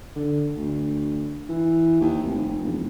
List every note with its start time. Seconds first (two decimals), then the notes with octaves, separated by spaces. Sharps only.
0.16 D3
0.56 D2
1.49 E3
2.00 D#2
2.23 F1
2.62 E1